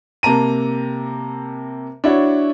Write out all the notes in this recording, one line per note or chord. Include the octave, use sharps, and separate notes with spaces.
C3 A#3 A5 A#5 D#7
D4 E4 F#4 C#5